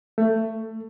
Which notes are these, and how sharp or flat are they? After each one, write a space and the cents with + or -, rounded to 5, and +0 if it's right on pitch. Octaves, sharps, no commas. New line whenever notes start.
A3 +20